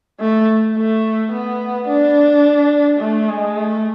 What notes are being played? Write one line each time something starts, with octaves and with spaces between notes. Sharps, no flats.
A3
A3
B3
D4
A3
G#3
A3